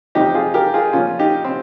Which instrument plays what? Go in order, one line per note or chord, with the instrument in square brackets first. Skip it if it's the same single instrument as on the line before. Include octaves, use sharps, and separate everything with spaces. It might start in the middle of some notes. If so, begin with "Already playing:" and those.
[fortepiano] F2 C3 F3 D#4 G4
F4 G#4
G4 A#4
F4 G#4
A#2 F3 C#4 F4
D#4 G4
C4